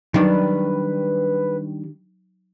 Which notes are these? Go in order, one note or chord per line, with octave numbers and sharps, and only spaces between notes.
D#3 F#3 G3 D4 D#4 B4